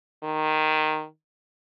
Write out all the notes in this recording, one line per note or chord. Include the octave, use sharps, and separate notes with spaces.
D#3